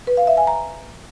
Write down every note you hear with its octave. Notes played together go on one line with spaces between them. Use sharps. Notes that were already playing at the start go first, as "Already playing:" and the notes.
B4
F5
E5
G#5
A#5